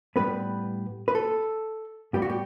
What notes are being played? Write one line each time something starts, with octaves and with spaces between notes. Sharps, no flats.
A2 G3 B3 B4
B4
A4
A2 G3 B3 G4
F#4
G4